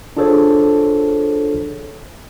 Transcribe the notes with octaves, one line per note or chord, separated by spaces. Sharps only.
D4 F4 G#4 A4 C5 C#5